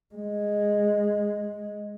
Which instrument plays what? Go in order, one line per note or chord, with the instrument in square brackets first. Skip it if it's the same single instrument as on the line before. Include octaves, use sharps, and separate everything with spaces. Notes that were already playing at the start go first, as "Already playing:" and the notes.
[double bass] G#3